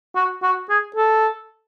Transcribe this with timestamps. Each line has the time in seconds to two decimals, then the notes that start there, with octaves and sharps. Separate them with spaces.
0.16 F#4
0.43 F#4
0.70 G#4
0.96 A4